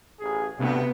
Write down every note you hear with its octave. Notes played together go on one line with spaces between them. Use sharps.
A1 G#4
D2 G2 C3 B3